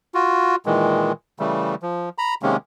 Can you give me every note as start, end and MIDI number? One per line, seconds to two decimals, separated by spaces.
0.14 0.56 65
0.14 0.56 66
0.66 1.12 46
0.66 1.12 51
0.66 1.12 52
0.66 1.12 56
1.39 1.75 49
1.39 1.75 52
1.39 1.75 55
1.39 1.75 57
1.82 2.09 53
2.18 2.34 82
2.18 2.34 83
2.43 2.57 48
2.43 2.57 51
2.43 2.57 56
2.43 2.57 58
2.43 2.57 61